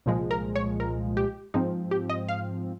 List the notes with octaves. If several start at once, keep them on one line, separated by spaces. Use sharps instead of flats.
C2 A#2 F3 G#3
A#4
C#5
A#4
G4
G#2 F3 C4 D#4
G4
D#5
F5